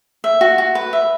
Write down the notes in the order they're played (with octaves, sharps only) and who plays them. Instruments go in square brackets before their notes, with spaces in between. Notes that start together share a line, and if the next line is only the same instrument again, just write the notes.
[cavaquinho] E5
F#4
F#4
B4
E5